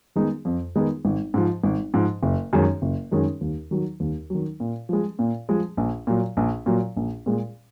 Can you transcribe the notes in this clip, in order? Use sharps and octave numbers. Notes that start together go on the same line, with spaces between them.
D#3 G#3 B3 D#4
F2
D#3 G#3 B3 D#4
G#1
G#2 F3
G#1
G#2 F3
F#1
F#2 D#3 G#3 C#4
F#1
F#2 D#3 G#3 C#4
D#2
D#3 F#3
D#2
D#3 F#3
A#2
F3 G#3
A#2
F3 G#3
A#1
A#2 F#3
A#1
A#2 F#3
A#1
A#2 G#3